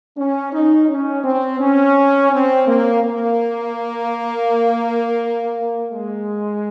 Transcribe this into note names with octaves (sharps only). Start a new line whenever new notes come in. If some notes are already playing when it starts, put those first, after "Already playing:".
C#4
D#4
C#4
C4
C#4
C4
A#3
A#3
G#3